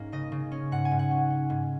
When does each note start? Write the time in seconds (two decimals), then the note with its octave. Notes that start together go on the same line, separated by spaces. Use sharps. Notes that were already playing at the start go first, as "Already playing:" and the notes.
Already playing: G#2 A#3 C#4
0.12 C#3 D#5
0.32 C#3
0.52 C#4
0.72 G#2 F#5
0.85 G#5
0.91 G#2
0.99 F#5
1.11 C#4
1.30 C#4
1.50 G#2